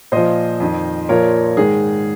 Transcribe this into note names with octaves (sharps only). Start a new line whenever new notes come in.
A#2 F3 C5 D#5
F2 D#3
A#2 F3 A#4 C#5
G#2 D#3 G#4